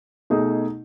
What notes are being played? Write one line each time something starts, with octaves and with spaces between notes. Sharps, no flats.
B2 A3 D#4 G#4